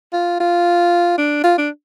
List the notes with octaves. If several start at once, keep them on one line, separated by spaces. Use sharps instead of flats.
F4
F4
D4
F4
D4